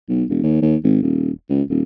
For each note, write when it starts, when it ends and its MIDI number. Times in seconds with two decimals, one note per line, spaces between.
0.09 0.24 35
0.29 0.41 28
0.43 0.61 39
0.62 0.76 39
0.84 0.97 32
1.02 1.31 27
1.49 1.62 37
1.70 1.82 27